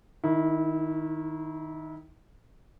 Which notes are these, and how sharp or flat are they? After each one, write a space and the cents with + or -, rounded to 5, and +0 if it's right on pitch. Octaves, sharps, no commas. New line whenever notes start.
D#3 +5 E4 -25